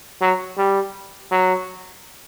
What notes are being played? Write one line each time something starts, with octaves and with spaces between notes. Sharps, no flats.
F#3
G3
F#3